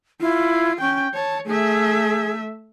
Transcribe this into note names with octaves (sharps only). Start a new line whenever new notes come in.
E4 F4
C#4 G5
C#5 A5
A3 G#4 E5